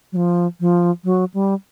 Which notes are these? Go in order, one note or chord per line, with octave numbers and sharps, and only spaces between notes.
F#3
F3
F3
F#3
G3